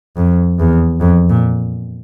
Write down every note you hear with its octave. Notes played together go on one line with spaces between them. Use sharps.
F2
E2
F2
A#2